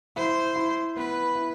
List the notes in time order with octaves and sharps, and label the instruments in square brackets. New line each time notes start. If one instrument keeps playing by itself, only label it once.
[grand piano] E4 [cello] C5
[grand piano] E4
[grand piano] B3 [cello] B4
[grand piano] E4